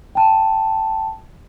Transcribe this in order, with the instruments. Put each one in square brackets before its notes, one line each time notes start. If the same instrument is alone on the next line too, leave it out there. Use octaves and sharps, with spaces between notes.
[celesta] G5 A5